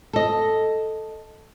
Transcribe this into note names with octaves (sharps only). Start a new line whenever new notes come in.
A4 D#5